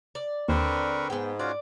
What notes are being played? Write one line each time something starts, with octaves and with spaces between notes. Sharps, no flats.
D5
D#2 D3 C4 A#4 B4 C#6
G#2 B3 G5
C#4 F4 F#4 D5